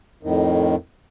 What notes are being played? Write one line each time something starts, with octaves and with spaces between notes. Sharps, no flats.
F2 A2 D#3